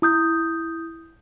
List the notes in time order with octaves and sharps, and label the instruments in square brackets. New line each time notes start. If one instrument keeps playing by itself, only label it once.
[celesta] E4 D#6 G6